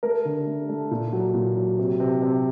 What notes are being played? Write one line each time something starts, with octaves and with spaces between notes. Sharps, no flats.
A3 A#4
D3
A3
A3
A#2
F#3
A#2
F#3
C3
C3
C3